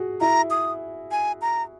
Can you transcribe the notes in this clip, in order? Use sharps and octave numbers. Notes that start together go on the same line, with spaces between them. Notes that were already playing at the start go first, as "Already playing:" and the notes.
Already playing: F#4 G#4
E4 A#5
D#6
G#5
A#5